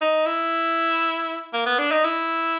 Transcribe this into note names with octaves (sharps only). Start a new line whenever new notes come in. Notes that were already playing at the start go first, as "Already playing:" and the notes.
D#4
E4
A#3
B3
D4
D#4
E4